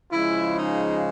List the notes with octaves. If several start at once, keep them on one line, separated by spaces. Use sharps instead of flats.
C#3 F3 G#3 E4
D#4